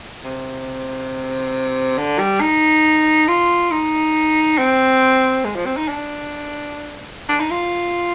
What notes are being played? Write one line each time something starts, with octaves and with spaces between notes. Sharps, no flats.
C3
D3
G3
D#4
F4
D#4
C4
G#3
F3
C4
D#4
D4
D4
D#4
F4